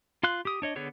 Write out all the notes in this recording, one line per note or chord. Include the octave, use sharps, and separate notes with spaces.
F4 F5 C6 F#6
G4 D#6
D4 C#5 D#5
D3 B3 G#4 C#5